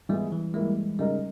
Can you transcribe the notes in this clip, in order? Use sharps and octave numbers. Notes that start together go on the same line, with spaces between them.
E3 G3 G#3 B3 E4 G#4
E3
G3 G#3 A#3 E4
C#3 G3 G#3 D#4 A#4 D#5